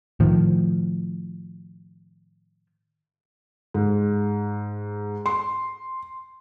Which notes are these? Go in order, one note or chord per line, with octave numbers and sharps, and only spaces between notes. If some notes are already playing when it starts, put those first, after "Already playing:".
A2 D#3 F3
G#2
C6